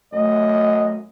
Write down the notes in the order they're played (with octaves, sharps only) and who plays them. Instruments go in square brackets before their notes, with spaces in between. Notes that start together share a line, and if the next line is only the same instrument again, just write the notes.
[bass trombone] F#2 [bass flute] A3 [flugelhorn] D#5